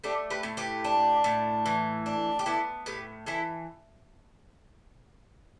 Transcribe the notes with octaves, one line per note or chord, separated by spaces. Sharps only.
A3 D4 G4
G4 B4
A2
G4 B4
D4
A2
E3
D4
G4
B3 E4 A4
A2 G4 B4
E3 E4 A4